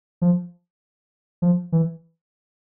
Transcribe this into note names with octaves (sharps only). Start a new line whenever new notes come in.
F3
F3
E3